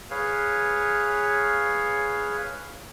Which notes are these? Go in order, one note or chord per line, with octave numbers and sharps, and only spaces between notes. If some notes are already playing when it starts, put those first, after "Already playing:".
G#4 B4 C#5 F5